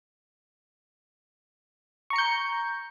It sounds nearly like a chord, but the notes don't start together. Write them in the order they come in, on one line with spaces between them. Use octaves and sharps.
C#6 A#5 C#7 G6